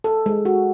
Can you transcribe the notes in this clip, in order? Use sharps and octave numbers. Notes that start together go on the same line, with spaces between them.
A4
G#3
F#4